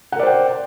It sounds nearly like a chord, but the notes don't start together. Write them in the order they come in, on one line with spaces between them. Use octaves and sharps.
F#5 A#4 D5 C5 G5